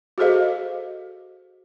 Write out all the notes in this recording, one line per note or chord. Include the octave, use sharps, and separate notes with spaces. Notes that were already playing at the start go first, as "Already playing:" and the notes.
F#4 G#4 A4 C5 D#5 F5